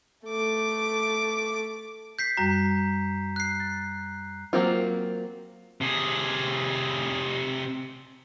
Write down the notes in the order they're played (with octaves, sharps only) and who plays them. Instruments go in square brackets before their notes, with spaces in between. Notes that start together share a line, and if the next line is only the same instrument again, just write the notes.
[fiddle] A3 D6
[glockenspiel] G6 B6 C7
[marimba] F#2 G3 F#4 [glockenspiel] A#5
[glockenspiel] F#6 C7
[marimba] A6
[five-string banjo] F#3 A#3 C4 F4
[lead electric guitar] C3 G#4